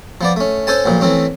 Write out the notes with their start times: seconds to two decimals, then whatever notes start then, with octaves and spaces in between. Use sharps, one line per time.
0.21 F3 B3 D5
0.36 A3 C#4
0.67 C#4 A4 C5 G#5 A5
0.85 B1 A#2 F3
1.01 E3 A3 C4 C#4